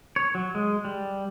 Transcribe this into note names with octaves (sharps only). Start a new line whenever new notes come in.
C#5
F#3
G#3
G3